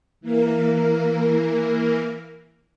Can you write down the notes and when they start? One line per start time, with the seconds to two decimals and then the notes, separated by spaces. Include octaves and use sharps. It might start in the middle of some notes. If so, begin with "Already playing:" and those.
0.21 E3 A#3 A#4